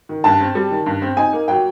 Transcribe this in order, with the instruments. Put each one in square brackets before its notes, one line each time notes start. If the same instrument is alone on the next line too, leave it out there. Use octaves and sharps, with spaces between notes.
[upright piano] D#3
[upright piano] G2 [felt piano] A5
[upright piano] C4
G3
D#3
G2
C4
[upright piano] D#4 [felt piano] G#5
[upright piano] A#3
[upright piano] F#3 [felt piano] G5